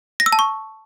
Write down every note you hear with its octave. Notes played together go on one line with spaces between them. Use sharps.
A#6
E6
A5
C#6